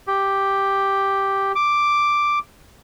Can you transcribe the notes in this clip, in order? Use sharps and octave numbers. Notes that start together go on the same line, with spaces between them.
G4
D6